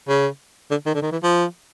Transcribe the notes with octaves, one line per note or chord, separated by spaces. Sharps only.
C#3
D3
D#3
D3
D#3
E3
F3